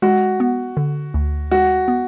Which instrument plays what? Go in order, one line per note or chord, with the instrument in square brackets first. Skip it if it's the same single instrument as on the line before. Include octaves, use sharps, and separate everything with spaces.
[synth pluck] G#3 [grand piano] F#4
[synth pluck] B3
D3
D2
[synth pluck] G#3 [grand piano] F#4
[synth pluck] B3